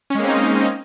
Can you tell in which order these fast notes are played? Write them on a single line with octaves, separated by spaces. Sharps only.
C#4 G#3 A#3 C4 D#4